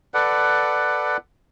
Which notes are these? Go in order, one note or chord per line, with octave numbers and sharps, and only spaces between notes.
A4 B4 D5 F#5